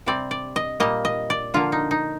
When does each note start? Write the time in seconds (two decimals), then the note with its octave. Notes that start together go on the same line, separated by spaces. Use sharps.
0.06 C3 G3 C4 D5
0.31 D5
0.56 D#5
0.80 A#2 G3 A#3 D#5
1.05 D#5
1.30 D5
1.54 D3 F3 A#3 F4
1.72 D#4
1.91 D#4